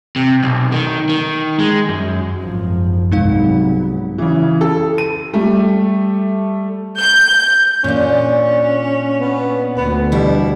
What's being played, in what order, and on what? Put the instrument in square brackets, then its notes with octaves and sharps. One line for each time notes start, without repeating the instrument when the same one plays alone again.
[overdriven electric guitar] C3
B1
D#3
D#3
G#3
F#2
[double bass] G#1 F#2 [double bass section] F3
[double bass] C2 G#2 [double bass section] F#3 B3 [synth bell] G#3 D#4 F5
[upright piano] C#3 E3
A4
D#7
G3 A3
[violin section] G6
[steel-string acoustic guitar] A#2 D4 [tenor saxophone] C#4
[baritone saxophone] B3
[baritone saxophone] D2 [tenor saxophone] B3
[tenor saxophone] B2 [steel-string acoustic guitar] G3 E4